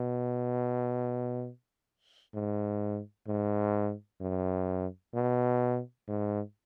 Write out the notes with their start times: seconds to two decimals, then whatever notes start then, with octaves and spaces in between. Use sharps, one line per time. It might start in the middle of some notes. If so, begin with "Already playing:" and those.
Already playing: B2
2.34 G#2
3.28 G#2
4.21 F#2
5.15 B2
6.08 G#2